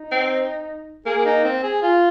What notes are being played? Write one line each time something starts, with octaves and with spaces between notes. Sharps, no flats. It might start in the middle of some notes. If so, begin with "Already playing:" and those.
Already playing: D#4
C4
A#3 G#4
D#4
C4
G#4
F4